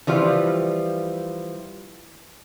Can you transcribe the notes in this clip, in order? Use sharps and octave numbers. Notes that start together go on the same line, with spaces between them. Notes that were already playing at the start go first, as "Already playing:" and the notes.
E3 F3 G3 F4